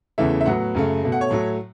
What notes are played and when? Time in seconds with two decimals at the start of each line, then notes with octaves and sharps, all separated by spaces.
0.18 E2 C#3 E3 A3 E5
0.41 E5
0.46 A2 F#3 B3 F#5
0.75 F#2 C#3 A3
1.03 B2 A3
1.12 F#5
1.21 C#5
1.31 A2 F#3 A3